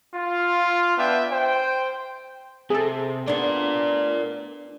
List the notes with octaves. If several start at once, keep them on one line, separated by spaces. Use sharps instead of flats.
F4
B3 D4 E5 G5
C5 G5
C3 G#4 A4
B3 D4 A#4 D5